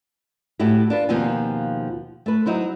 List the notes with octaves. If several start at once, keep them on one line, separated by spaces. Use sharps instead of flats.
A2 E4 F#4 G4
D4 F4 B4
D#2 B2 F3 C4 F4 G#5
A3 B4
F#3 D#4 E4 C5